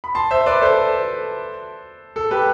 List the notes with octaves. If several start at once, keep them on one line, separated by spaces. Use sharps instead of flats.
B5
A5 C6
C5 E5
B4 D5
A4 C5
A4
G4 B4